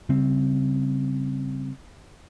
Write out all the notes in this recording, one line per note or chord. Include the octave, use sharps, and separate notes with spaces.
C#3 G3 C4